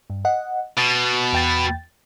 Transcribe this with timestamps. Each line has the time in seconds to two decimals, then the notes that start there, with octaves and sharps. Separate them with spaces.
0.10 G2
0.25 D#5 F#5
0.78 B2 A6
1.33 E2 G5 A6